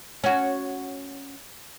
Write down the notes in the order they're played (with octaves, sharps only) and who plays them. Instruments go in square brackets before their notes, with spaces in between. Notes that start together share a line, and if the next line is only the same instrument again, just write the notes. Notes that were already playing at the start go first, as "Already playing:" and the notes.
[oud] C#4 F#4